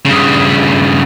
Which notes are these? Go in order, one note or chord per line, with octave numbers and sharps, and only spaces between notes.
G2 C#3